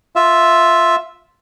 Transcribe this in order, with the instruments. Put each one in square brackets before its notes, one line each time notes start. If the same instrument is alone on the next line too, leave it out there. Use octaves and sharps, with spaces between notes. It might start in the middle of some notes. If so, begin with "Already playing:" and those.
[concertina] F4 E5